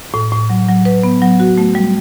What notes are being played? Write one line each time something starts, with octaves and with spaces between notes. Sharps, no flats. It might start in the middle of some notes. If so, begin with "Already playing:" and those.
A2
A2
F#3
F#3
B4
B3
F#3
F#4
A3
G3